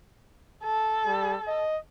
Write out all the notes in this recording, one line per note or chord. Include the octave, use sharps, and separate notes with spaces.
A4
G3
D#5